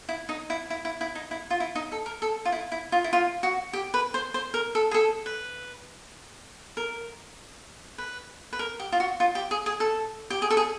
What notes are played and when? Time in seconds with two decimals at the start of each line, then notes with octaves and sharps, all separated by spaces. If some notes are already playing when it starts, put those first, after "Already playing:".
0.09 E4
0.29 D#4
0.50 E4
0.70 E4
0.85 E4
1.01 E4
1.15 D#4
1.31 E4
1.50 F4
1.60 E4
1.75 D#4
1.92 A4
2.06 A#4
2.22 A4
2.45 F4
2.52 E4
2.72 E4
2.92 F4
3.04 E4
3.13 F4
3.43 F#4
3.73 G4
3.94 B4
4.14 C5
4.34 C5
4.54 A#4
4.75 A4
4.91 G#4
4.94 A4
5.26 B4
6.77 A#4
7.98 B4
8.53 B4
8.59 A#4
8.80 G4
8.92 F4
9.00 F#4
9.20 F4
9.35 G4
9.51 G#4
9.66 G#4
9.80 A4
10.30 G4
10.42 G#4
10.51 A4
10.57 G#4